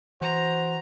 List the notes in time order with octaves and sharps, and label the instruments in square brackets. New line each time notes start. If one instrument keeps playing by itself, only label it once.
[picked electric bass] E3 [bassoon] F#4 [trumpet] C5 [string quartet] A#5